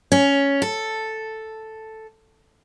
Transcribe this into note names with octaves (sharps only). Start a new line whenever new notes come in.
C#4
A4